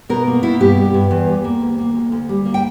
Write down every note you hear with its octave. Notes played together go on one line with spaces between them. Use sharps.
B2 A#4
A#3
B2 E4
G2 G4
G3
G2
E2
G3
A#3
D2
A#3
D2
D2
G3
A#3
G5